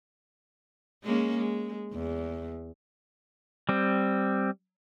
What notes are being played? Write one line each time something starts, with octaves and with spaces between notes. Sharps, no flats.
G#3 A#3 C#4
G#3
E2
G3 C4